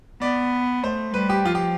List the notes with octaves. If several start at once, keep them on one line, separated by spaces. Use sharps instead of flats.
B3 D5
A3 C5
G3 B4
G4
F3 F4
G4